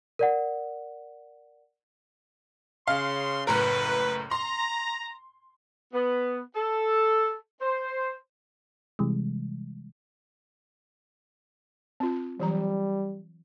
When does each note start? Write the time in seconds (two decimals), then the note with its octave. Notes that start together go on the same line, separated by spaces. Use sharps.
0.19 A#4 D5 F#5
2.88 C#3 F5 C6
3.47 F#1 A2 A#4 B4
4.31 A#5 C6
5.93 B3
6.56 A4
7.61 C5
8.99 C3 E3 G3 G#3
12.00 C4 F4
12.40 E3 F#3 G3 A#5